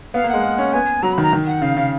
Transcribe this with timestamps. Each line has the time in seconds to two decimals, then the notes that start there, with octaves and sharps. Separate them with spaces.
0.14 B3 F5
0.24 A#3
0.29 G#3 F#5
0.43 A#3
0.58 C#4
0.73 B3 G#5
1.03 F#3 A#5
1.13 D#3 B5
1.23 A#5
1.33 D#3
1.47 F#5
1.62 C#3 F5
1.77 C#3